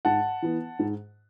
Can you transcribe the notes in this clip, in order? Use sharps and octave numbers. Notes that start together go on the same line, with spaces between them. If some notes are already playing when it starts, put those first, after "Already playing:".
G#2 F#5 A5
E3 B3
G#2